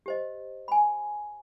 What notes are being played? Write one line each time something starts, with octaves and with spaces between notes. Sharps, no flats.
G4 C5 D#5
G#5 B5